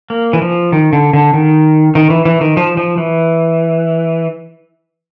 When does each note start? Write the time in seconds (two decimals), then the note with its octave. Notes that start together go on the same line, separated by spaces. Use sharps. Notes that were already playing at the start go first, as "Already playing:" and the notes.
0.10 A#3
0.33 E3
0.42 F3
0.72 D#3
0.93 D3
1.13 D3
1.34 D#3
1.95 D#3
2.10 E3
2.25 E3
2.41 D#3
2.57 F3
2.77 F3
2.98 E3